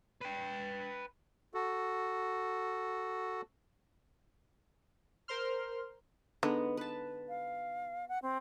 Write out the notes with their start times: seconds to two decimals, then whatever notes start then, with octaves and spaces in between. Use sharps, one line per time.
0.21 B4 G5
1.54 F#4 A4
5.28 A#4 C5 C6 F6
6.43 D3 G#3 B3 D#4
6.77 B4 A5
7.29 F5
8.08 F#5
8.22 C4